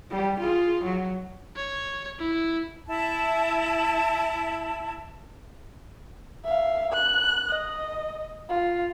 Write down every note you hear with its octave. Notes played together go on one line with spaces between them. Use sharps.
G3 G4
F4 G#4
F#3
C#5
E4
E4 A5
E5 F5
F#6
D#5
F4